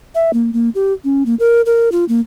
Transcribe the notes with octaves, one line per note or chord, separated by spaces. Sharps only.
E5
A#3
A#3
G4
C#4
A#3
A#4
A#4
F4
A#3